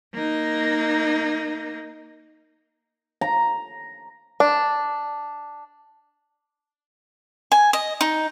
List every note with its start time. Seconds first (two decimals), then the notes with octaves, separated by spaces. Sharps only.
0.15 A#3 D#4
3.21 A#5
4.40 D4
7.52 G#5
7.73 D#5
8.01 D#4